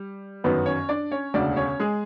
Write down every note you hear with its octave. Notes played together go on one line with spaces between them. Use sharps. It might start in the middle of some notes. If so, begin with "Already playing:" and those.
Already playing: G3
G1 F#2 D#3 B3 B4
C#4 C#5
D4 D5
C#4 C#5
E1 D2 C#3 D4 D5
C#4 C#5
G#3 G#4